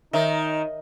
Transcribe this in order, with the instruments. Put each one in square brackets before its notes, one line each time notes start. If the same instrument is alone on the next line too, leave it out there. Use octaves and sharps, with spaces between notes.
[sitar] D#3 [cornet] D#4 [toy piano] A#4 C#5 E5